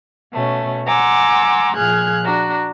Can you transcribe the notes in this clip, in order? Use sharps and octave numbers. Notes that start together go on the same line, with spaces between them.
B2 A3 C#4
F#5 G#5 A#5 C6 D6 E6
A#2 F3 G#4 F6 F#6 G#6
D4 F#4 A#5